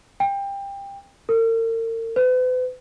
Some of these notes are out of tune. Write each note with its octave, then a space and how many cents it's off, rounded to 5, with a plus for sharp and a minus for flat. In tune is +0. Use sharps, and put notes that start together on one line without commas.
G5 +25
A#4 -40
B4 +45